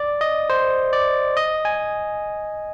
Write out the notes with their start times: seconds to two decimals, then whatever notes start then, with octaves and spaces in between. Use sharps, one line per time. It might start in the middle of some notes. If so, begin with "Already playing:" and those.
Already playing: D5
0.21 D#5
0.50 C5
0.93 D5
1.37 D#5
1.65 G#5